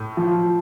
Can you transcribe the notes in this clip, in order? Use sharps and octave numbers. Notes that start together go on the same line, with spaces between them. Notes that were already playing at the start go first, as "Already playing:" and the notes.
Already playing: A2
F3